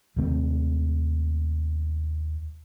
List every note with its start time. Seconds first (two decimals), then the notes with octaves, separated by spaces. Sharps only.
0.16 D#2 C3 A3 C4